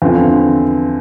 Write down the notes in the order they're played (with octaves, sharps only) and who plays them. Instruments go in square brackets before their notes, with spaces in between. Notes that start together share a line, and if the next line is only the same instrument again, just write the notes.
[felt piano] E2 D3 F3 C4